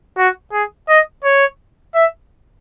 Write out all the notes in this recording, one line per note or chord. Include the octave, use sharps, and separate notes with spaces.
F#4
G#4
D#5
C#5
E5